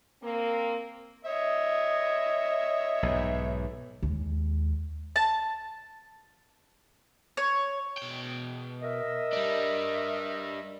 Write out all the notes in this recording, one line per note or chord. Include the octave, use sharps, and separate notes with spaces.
A#3 C4
C#5 D#5 E5
B1 G#2
D#2 G#3
A5
C#5
B2 G5
A#4 D#5 E5
G3 D4